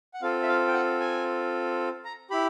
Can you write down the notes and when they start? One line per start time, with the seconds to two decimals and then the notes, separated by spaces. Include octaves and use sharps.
0.14 F#5
0.22 C4 F4 A4 F5
0.43 E5
0.48 F5
0.67 G5
0.73 F#5
1.00 G#5
2.05 A#5
2.30 E4 G4 B5